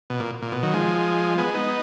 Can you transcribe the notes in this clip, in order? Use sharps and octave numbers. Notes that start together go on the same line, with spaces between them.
B2
A#2
A#2
B2
D#3 F#3
F3 G#3
G#3 B3
B3 D#4